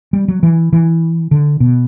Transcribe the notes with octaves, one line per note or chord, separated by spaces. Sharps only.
G3
F#3
E3
E3
D3
B2